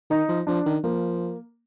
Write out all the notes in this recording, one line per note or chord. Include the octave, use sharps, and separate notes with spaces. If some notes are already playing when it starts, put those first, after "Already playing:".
D#3 D#4
F3
F3 D4
D#3
F3 A#3